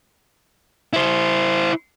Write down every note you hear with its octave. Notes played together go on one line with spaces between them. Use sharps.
E4 C5